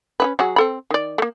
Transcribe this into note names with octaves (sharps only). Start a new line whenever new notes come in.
C#4 E4 B4
F#3 F#4 G#4
C4 A4 B5
D#3 D5
A3 A#3